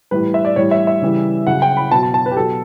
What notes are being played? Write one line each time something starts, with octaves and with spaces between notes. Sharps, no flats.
A2 E3 G3 B4
E5
D5
A2 E3 G3 C#5
E5
E5
C#3 E3 G3
C#3 F#3 F#5
G5
B5
B2 F#3 A5
A5
A5
B4
G4
B2 F#3 A4